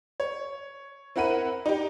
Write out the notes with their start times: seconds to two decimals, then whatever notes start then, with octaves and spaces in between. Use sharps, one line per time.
0.20 C#5
1.16 C4 E4 A#4 F#5 B5 D#7
1.66 D#4 G4